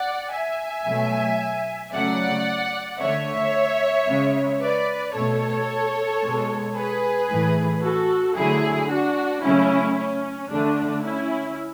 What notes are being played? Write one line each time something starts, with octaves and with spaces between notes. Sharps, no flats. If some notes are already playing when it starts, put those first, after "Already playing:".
Already playing: D5 F#5
E5 G#5
B2 F#3 A3
C#3 F#3 A3 D5 F#5
D3 A3 C#5 E5
C#3 G#3
B4 D5
B2 A3 A4 C#5
B2 G#3
G#4 B4
A2 E3 A3
F#4 A4
D3 F#3 A3 E4 G#4
D4 F#4
C#3 F#3 A3 C#4 E4
C#4
D3 A3 D4
C#4 E4